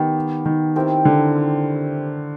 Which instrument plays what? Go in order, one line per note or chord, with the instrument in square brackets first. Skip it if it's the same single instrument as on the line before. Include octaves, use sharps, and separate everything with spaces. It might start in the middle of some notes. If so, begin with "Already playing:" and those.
Already playing: [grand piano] D#3 [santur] B3 D#4 G4
[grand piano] D#3
[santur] C4 E4 G4 A#4
[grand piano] D3